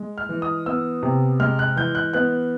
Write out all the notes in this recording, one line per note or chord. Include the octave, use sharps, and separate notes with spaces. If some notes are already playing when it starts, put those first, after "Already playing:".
Already playing: G#3
F6
E3
D#6
B3 E6
C3
G#3 F6
F#6
E3 G6
F#6
B3 F#6